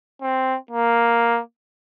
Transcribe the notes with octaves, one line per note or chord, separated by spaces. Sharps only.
C4
A#3